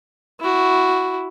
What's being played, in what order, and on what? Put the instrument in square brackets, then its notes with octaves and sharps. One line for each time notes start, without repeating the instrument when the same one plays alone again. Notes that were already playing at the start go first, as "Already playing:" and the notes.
[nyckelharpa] E4 F#4